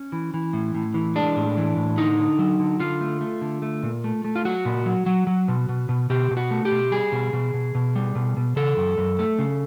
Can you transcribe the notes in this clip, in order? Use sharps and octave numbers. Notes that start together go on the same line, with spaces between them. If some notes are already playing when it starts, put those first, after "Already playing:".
Already playing: C#4
E3
E3
A2
A2
E3
G#3 D4
A2
E3
A2
D3 D#4
D3
F#3
D3
D3 F4
A3
A3
D3
A3
A#2
A3
A3
F4
F#3 F#4
A#2
F#3
F#3
F#3
B2
B2
B2
B2 G4
B2
F#4
A3
G4
B2
G3 G#4
B2
B2
B2
B2
G3
B2
B2
C#3 A4
F#2
F#2
A3
C#3